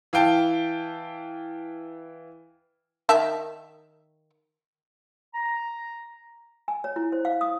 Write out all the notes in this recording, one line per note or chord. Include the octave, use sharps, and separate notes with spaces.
E3 F5 G5 A5
D#3 E5 A5
A#5
G#5
C#5
E4
C5
F5
D#6